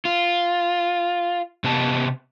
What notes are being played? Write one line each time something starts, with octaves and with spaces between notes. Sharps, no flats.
F4
C3 B3 G4 A5